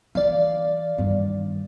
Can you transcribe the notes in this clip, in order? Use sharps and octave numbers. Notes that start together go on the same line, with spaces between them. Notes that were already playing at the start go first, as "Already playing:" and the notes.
E3 D5 F5
G2 D#3